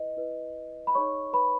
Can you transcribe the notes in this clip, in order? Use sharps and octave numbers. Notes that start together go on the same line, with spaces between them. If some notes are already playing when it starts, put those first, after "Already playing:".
Already playing: E4 B4 D#5
E4 B4
B5
D#4 G#4 C#5 C#6
B4 B5